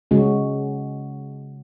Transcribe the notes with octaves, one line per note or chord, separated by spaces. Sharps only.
C#3 G#3 C#4 F#4